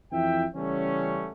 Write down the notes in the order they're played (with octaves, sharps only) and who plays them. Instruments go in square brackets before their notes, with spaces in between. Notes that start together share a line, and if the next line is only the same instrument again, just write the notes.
[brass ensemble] F2 E3 E4 E5 G5
C#3 E3 G3 A3 B3 C#4